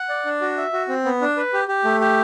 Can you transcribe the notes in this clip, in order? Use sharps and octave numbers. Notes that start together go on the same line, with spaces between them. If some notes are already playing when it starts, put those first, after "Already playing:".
Already playing: F#5
D5
D4
F#4
E5
F#4
C4
B3
D4
B4
G4
G4
A3
G4